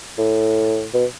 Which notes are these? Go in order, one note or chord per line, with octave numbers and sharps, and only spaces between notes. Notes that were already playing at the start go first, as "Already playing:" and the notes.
A2
B2